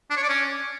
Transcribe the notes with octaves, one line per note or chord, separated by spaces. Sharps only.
D4
C#5
D5
C#4